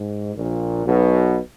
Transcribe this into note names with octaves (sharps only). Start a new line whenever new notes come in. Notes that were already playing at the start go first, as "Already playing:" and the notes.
Already playing: G#2
A#1 A#2
B1 B2